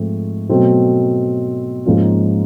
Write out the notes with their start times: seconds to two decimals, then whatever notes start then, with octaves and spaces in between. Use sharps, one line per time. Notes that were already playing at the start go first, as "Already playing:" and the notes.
Already playing: G#2 F3 A3 C4
0.49 B2 F#3 A3 C4
1.85 G#2 F3 A#3 C#4 F4